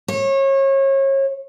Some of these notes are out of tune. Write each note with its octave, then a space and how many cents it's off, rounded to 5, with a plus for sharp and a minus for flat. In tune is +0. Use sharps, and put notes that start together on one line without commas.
C#5 -30